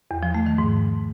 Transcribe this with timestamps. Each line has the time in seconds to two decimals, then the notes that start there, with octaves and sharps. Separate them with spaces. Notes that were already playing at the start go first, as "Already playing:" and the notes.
0.11 E2
0.23 F3
0.35 A3
0.46 D#3
0.58 G#2